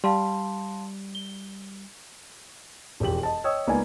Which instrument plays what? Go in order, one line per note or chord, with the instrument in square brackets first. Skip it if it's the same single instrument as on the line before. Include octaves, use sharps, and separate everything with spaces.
[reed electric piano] G3 [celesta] F5 A5 C6
[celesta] G7
[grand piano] E1 F2 G4 F#7
D#5 A5
C#5 D#5 G5 D#6 E6
C#2 A#3 B3 D#4 D5 G#5